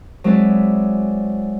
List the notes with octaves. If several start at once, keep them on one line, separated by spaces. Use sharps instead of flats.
F#3 G#3 C4 E4 B4 D5